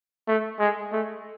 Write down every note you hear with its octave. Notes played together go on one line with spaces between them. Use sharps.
A3
G#3
A3